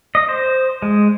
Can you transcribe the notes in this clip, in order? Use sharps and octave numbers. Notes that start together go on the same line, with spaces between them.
D#5
C5
G#3